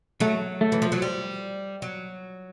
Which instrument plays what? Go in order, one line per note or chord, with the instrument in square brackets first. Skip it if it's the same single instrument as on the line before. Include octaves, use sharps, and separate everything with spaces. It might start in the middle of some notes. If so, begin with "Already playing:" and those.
[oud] F#3 [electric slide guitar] A3
[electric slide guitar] A3
[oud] E3
F3
F#3
G3
F#3